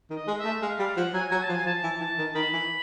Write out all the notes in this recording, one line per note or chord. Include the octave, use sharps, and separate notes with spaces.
D#3
D#5
G#3
E5
A3
G#3 F5
G3 F5
F3 F#5
F#3 G#5
F#3 G#5
A5
F3
G#5
F3 A5
E3
E3 A5
D#3
D#3 B5
E3